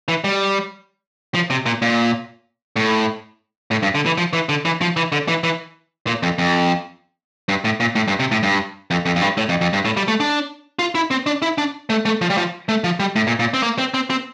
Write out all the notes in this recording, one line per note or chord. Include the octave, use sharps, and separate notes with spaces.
E3
G3
F3
C3
A#2
A#2
A2
A2
G2
D3
E3
F3
E3
D3
E3
F3
E3
D3
E3
E3
A#2
F2
F2
G2
A2
A#2
A2
G2
C3
A2
G2
F2
F2
F2
G2
A2
F2
F2
G2
A2
G3
A3
D4
F4
E4
C4
D4
E4
D4
A3
A3
F3
G3
F3
A3
F3
G3
A2
A#2
A#2
C4
A#3
C4
C4
C4